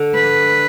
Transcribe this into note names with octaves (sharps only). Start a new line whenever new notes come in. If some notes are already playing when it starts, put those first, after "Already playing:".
Already playing: D3
B4